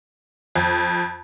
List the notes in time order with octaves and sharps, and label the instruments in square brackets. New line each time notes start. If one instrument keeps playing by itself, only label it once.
[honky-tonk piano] F2